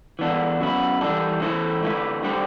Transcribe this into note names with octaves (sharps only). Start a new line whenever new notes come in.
E3 B3 D4 A4
F#2 F#3 B3 E4
E3 G3 D4 A4
E3 A3 E4 A4 C5
D3 A3 E4 B4
G3 D4 A4 C5